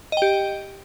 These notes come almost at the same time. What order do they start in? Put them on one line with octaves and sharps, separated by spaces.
D#5 G5 G4